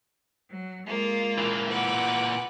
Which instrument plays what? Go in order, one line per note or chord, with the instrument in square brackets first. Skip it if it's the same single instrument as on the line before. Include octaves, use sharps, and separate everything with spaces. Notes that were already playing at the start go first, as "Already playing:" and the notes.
[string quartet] F#3
G#3 A#3 F4
[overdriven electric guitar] A#2 E3
[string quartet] B4 F#5 D6